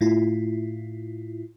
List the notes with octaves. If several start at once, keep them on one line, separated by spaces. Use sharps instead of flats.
A2 E4 F4